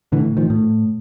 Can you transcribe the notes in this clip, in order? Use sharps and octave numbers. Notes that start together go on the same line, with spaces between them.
A2 D3 E3
D#3 F3
A2